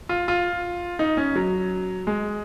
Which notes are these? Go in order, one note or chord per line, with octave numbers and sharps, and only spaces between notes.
F4
F4
D#4
C#4
F#3
G#3